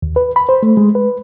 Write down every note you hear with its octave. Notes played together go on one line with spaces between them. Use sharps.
D#2
B4
B5
C5
A3
G#3
B4